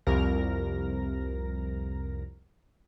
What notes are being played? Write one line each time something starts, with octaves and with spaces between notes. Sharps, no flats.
C2 F2 A#4 A#6